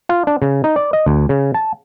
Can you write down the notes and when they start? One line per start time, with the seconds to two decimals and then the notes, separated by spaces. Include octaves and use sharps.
0.09 F4
0.27 D4
0.42 C#3
0.64 D#4
0.76 D5
0.93 D#5
1.06 D2
1.29 C#3
1.54 A5